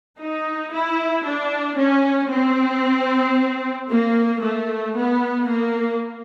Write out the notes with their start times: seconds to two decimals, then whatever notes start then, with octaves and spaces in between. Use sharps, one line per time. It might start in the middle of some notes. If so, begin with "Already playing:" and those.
0.20 D#4
0.73 E4
1.26 D4
1.78 C#4
2.31 C4
3.90 A#3
4.42 A3
4.96 B3
5.48 A#3